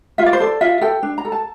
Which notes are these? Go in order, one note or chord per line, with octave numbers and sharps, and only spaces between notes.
F4 E5
D5
C5
A4 D5
F4 E5
A4 G5
D4
A#5
A4
A5